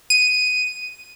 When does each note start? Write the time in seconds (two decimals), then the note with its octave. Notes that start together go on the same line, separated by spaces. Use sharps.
0.10 D#7